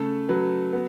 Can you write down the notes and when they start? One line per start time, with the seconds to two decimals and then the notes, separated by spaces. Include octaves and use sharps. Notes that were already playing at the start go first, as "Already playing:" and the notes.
Already playing: C#3 A3 A4
0.29 F#3 B4
0.73 B3